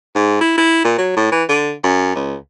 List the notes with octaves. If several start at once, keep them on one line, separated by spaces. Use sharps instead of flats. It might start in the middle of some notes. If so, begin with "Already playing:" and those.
G#2
E4
E4
A#2
F#3
A2
E3
D3
F#2
C#2